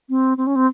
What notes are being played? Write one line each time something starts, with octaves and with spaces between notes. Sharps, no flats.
C4
C4
C#4
C4